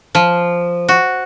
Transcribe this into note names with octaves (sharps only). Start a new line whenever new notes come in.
F3
F#4